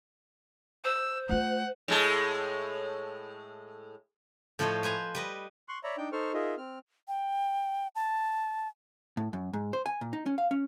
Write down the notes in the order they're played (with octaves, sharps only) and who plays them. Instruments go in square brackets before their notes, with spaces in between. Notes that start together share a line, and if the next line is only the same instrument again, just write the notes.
[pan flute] C5 [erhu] E6
[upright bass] A3 F4 [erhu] F#5
[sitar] A2 G#3 A4
[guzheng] A2 F3 A4 C5 C#5 D#5
B4 C5 G#5 A#5
G3 B4 D#5
[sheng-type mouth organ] C6 C#6 F#6
C#5 D5 E5 A#5 B5
D4 D#4 G5 G6
D#4 A4 C5 C#6 F6
D#4 F4 G#4 A#4 D#5 E5
C4 F6
[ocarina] G5
A5
[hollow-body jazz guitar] A2
F#2
G#2
C5
G#5
A#2
D#4
C#4
F5
C#4